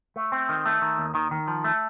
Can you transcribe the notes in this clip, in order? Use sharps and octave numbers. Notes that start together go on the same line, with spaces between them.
A3
C4
D#3
A3
D#3
D#2
D#3
D#3
F3
A3